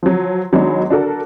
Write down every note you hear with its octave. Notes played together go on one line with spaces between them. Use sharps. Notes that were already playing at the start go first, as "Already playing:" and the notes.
F3 F#3
D#3 F#3 G#3 B3 D4 D#4
D4 F#4 A4 A#4